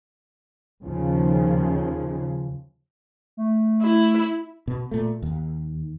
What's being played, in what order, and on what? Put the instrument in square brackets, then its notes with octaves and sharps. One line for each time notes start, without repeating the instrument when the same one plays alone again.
[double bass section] D#2 C#3 F3
[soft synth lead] A3
[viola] E4
[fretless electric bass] B2
A#2 A3
D#2